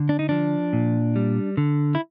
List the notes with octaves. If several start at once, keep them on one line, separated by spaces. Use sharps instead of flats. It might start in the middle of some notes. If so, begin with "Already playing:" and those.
Already playing: D3
D4
D#4
F3 D4
A#2
G3
D3
E4